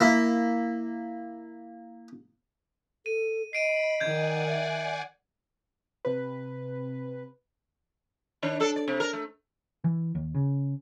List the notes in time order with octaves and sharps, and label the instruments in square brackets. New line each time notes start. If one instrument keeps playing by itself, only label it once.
[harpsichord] A#3 E4
[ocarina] A4 [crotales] D#7
[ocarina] D#5 [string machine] B5 [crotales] C7 D7 D#7
[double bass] D#3 [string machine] D5 F#5 G#5 [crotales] G6 G#6
[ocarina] E5
[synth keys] C3 B4
[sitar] D#3 D4 C#5
D4 A4
D5
C3
D4 A#4
A3
[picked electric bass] E3
D#2
C#3